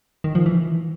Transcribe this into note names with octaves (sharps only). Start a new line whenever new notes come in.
D#3
F3
E3